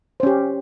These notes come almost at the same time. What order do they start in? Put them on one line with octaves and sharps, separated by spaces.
C5 C#4 G4